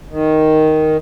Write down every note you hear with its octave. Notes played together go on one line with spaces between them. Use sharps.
D#3